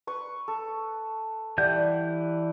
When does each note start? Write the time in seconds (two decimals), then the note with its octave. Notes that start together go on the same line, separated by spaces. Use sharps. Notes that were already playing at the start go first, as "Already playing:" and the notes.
0.07 B4 C#6
0.48 A4
1.58 E3 G3 E5 F#5 G6